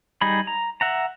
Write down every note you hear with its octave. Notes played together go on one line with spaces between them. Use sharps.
G3 D#4 G#4 B5
A#5
E5 F#5 A#5